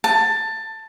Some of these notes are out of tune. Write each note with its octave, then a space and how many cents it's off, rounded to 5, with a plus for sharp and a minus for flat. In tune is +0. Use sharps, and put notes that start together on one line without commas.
A5 +15